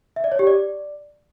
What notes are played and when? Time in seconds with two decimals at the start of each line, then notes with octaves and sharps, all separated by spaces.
0.16 E5
0.24 D5
0.32 C#5
0.39 G4
0.47 D5